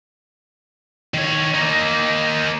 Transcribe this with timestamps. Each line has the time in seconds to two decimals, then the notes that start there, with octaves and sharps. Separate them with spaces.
1.14 D#3 C#5
1.54 A#3 D#4